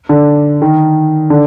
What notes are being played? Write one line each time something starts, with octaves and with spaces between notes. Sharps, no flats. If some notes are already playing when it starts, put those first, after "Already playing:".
D3
D#3
D3